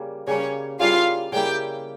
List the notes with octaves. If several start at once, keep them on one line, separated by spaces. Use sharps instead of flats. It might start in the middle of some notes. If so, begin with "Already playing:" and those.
Already playing: C#3 G3 A#3
C#3 G3 A#3 C#4 C#5
C#3 G3 A#3 E4 F4 F5
C#3 G3 A#3 E4 G4 G5